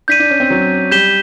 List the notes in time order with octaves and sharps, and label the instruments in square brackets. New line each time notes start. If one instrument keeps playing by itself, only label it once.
[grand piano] D4 [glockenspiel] G6 B6 D#7
[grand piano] D4
C#4
C4
F#3
[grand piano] G3 [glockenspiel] G6 B6 E7 G7